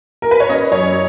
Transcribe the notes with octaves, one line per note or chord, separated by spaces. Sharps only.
A#4
B4
C#5
C#4 D#5
F#2 C#5